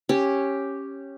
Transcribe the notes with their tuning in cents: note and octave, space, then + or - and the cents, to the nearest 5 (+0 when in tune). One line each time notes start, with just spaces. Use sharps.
C#4 -10 G4 +0